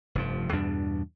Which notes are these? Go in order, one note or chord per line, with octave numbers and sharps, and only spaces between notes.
F1 G2 F3
E2 G2 B2 D4